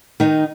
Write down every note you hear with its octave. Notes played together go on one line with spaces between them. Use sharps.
D#3 D#4